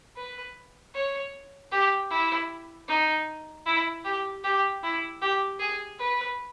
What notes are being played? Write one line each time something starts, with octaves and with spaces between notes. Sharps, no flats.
B4
C#5
G4
E4
D#4
E4
G4
G4
E4
G4
G#4
B4